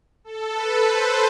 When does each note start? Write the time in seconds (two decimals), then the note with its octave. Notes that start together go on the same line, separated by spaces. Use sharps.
0.24 A4
0.54 B4
0.84 C5